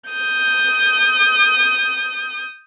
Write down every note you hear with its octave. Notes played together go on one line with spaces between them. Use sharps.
D#6 G6